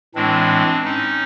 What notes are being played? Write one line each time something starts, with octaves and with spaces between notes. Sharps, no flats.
A2 E3 G#3 C4 D4
C#4 D#4